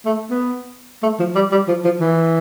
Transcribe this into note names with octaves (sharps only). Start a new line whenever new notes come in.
A3
B3
A3
F3
G3
G3
F3
F3
E3